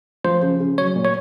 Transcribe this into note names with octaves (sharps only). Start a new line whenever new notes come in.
F3 C5
C#3
C#3
F#3 C#5
A#2
C#5